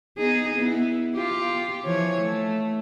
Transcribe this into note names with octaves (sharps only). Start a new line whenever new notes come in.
B3 D#4 G#4
B3 E4
F4 G4
E3 F3 C#5
A3